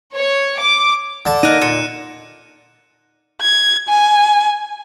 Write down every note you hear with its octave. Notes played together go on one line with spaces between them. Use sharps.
C#5
D6
D3 A5
A#3 D#4 A#4 D#5 F#6 D#7
A#2 C#7 E7
G#6
G#5